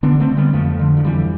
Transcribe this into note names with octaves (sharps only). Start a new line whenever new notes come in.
D3 B3 D4
A3 C4
D3
G3 B3
F2 F3 A3
D3
F3
F2 E3 G3